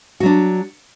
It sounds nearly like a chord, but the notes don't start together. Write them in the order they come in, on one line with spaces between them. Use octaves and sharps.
F#4 F#3 D4